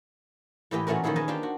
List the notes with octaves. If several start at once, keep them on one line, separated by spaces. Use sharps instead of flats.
A2 E3 G4 B4 D#5
A#2 E3 A3 C#4 F#4 A#4
D#3 F3 C#4 E4 G#4
A#4 B4 D#5 G#5 A5
D4 F4 G4 C5
F#4